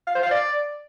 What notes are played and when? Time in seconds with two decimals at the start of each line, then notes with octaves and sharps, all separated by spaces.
0.07 F5
0.15 C5
0.23 F5
0.31 D5